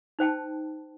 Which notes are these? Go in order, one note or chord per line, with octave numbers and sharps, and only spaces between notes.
D#4 C5 G5 A5